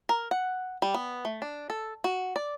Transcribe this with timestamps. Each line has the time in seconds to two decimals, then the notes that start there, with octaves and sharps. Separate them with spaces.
0.09 A#4
0.31 F#5
0.82 G3
0.94 B3
1.25 A3
1.42 D4
1.70 A4
2.04 F#4
2.36 D5